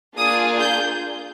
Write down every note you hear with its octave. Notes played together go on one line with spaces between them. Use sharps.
A#3 D4 F4 G#4 D#6
G6